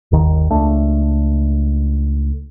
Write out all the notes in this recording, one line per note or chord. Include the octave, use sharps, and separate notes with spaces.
G1 D#2 D#3
C#2 A3 D4